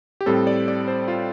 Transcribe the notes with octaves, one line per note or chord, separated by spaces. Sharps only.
G4
A2 G3 C4 A4
D5
D5
C5
F4